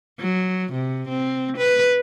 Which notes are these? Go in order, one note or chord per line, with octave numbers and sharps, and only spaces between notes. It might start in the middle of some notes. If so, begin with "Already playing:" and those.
F#3
C3
C4
B4